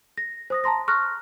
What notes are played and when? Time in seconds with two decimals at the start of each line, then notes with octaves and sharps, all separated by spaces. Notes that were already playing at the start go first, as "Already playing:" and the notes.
0.18 A#6
0.50 C5 D#6 A#6
0.64 A5 A#5 C6 A#6
0.88 C#6 F6 F#6 A#6